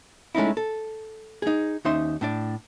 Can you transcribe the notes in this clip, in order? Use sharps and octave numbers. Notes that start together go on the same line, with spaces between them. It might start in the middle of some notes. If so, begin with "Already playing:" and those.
G#3 A3 C#4 D#4 E4
A4
D#4 G#4
D#2 C#4 D#4 C5 E5 C6
A2 D4 D5